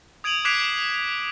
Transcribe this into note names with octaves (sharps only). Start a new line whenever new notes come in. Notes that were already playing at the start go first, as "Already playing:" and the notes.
D#6 G#6 D7 D#7 F7 F#7
D6 F#6 G#6 B6 C7 D7